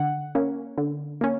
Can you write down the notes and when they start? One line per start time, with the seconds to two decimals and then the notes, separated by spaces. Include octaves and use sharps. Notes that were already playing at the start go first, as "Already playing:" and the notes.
Already playing: D3 F#5
0.35 A#3 C#4
0.78 D3
1.21 A#3 C#4